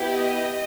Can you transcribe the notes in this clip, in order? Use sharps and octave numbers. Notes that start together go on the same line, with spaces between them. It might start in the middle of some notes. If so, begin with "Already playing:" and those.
Already playing: B3 E4 G4
D#5